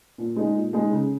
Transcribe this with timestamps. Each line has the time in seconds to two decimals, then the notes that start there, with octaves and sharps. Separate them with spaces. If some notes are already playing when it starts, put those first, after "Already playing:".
0.18 A#2
0.36 G#3 D#4 G#4
0.55 A#2
0.73 G#3 D#4 G#4
0.91 C#3